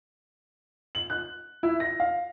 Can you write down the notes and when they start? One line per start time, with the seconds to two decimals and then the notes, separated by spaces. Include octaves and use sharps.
0.95 F#7
1.10 F#6
1.63 E4
1.80 A#6
2.00 F5